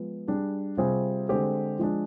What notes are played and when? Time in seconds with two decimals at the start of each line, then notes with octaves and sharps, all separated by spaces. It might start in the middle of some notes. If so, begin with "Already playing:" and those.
Already playing: F3 G#3 B3
0.28 G3 D4 G#4
0.77 C3 G3 C4 F4 G#4
1.29 D3 G#3 C4 G4
1.79 F3 G#3 D4